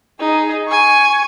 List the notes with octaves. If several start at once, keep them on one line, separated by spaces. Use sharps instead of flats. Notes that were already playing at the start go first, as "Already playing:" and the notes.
D#4 G#4
G#5 C#6